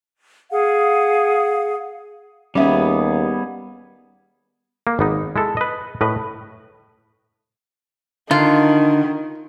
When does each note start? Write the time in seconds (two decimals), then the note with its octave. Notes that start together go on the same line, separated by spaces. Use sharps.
0.51 G#4 F5 F#5
2.55 D#2 G3 B3 C#4 G#4 E5
4.87 A#3
4.99 G#1 B3 D#4
5.36 G#3 E4 A4
5.57 B4 D#5
6.01 A2 B4 D#5
8.31 D3 D#3 F4